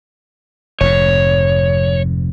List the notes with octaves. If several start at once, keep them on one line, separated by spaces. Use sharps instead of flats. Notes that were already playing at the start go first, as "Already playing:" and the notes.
F1 F2 G#2 C#5